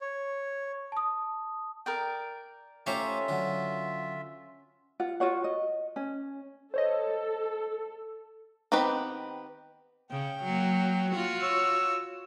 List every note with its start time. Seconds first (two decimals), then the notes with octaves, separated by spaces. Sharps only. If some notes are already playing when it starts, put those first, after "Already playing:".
0.01 C#5
0.92 A5 D#6
1.86 A#4 D5 G5
2.86 A3 C#4 F4 G4 C5 E5 A#5
3.28 D3 F#3
5.00 F4 F#5
5.20 F4 F#4 C#5 F#5
5.44 D#5
5.96 C#4
6.74 A4 C5 C#5 D#5
8.72 D#3 B3 C4 G4 B4
10.11 C#3 G5
10.44 F#3 A#3
11.11 F4 F#4
11.42 C#5 E6